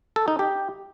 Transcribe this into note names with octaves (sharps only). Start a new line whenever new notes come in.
A4
D#4
G4